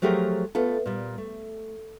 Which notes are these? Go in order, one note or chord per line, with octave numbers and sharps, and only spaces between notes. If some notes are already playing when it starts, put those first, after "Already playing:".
F3 F#3 A3 G4 G#4 A#4
A3 B3 F4 A4
A#2 G3
A3